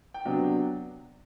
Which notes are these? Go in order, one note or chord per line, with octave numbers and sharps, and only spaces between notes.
G5
C3 F#3 B3 D4